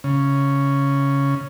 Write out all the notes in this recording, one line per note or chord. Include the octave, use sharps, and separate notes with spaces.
C#3